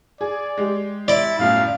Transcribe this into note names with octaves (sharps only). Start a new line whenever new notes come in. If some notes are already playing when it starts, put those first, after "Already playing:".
G#4 D5
G#3 G4
E4 D5
G1 F#2 A2 F5